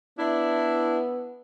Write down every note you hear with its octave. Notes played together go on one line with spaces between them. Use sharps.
B3 D4 E4